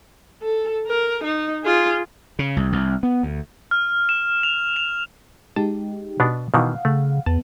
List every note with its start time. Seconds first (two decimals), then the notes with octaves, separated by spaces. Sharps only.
0.42 A4
0.87 A#4
1.23 D#4
1.64 F4 G#4
2.39 C#3
2.57 C2
2.72 C2
3.03 B3
3.23 D2
3.71 F6
4.09 E7
4.43 F7
4.76 F7
5.56 G#3 D#4 G4 A5
6.20 B2 B3 D4
6.54 B2 D#3 E3 F5 F#5
6.85 C#3 A3
7.26 E2 B3 A5